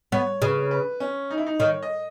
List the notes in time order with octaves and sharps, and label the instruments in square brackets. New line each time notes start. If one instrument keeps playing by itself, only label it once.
[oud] B3 [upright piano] C#5
[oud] C#3 [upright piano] B4
[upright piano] B4
C#4
D#4
E4
D#4
[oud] D#3 [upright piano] C#5
[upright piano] D#5